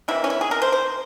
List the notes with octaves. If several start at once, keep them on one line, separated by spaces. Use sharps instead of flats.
C3 E3 A#3 E4
C#4
E4
G#4
A#4
C5
C5